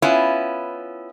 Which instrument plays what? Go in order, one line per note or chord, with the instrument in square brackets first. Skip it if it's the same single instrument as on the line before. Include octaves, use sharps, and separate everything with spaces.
[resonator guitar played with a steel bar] B3 C#4 E4 F4